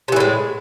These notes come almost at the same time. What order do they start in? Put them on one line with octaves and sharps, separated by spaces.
C3 E3 A2 G#3